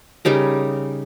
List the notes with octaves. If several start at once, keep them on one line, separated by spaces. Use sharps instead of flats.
C#3 G3 D#4 A#4